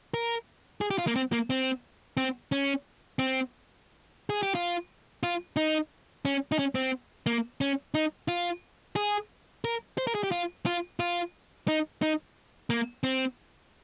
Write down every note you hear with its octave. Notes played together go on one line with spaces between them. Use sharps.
A#4
G#4
G4
F4
A#3
C4
A#3
C4
C4
C#4
C4
G#4
G4
F4
F4
D#4
C#4
D#4
C#4
C4
A#3
C#4
D#4
F4
G#4
A#4
C5
A#4
G#4
G4
F4
F4
F4
D#4
D#4
A#3
C4